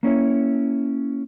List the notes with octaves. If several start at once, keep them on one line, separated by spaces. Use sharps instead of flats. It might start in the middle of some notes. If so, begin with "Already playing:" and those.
A#3 C#4 E4 C#5